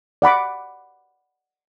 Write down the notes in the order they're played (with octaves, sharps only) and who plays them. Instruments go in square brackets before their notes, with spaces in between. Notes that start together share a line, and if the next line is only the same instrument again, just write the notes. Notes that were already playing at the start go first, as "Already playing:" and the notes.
[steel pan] D5 F#5 B5 D6